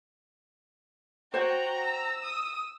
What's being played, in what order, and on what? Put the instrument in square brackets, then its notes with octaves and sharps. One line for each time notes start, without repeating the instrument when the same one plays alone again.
[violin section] F#4 G5 F#6 [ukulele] C5 C#5 [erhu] A#5
[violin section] E6
[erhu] D#6